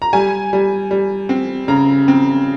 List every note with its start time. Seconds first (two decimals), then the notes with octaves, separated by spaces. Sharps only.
0.02 A#5
0.13 G3 G#5
0.53 G3
0.91 G3
1.29 C4
1.68 C#3 A#5
2.08 C4